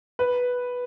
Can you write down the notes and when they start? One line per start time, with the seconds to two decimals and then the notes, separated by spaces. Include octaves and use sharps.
0.19 B4